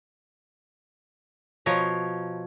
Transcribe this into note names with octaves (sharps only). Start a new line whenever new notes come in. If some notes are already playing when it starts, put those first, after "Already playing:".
B2 F3 C#5 A#5